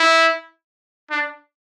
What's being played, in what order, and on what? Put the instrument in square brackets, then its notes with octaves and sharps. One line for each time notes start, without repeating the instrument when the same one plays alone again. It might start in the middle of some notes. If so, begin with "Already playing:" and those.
Already playing: [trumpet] E4
D4